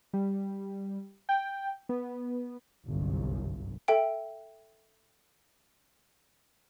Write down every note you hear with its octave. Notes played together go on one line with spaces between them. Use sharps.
G3
G5
B3
G1 C2 F#2
A4 E5 G5 D7